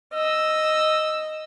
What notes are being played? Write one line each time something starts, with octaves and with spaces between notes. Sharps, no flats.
D#5 E6